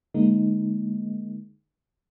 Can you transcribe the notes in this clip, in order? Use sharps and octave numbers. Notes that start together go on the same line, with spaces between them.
D3 G#3 A#3 D#4